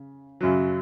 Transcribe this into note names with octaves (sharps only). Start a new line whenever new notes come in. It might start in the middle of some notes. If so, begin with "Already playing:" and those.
Already playing: C#3
F#2 C#3 F#3